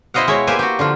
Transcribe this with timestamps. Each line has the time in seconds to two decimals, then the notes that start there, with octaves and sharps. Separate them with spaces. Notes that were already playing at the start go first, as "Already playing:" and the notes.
0.14 B2 E4 C5 D#5 F5 F#5
0.27 G#3 E4 F#4 C#5
0.47 A#3 G4 B4 C5 E5 G#5
0.59 F#4 G4
0.79 D3 F3 F4